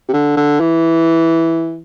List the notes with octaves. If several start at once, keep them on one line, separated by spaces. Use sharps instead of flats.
C3
D3
D3
E3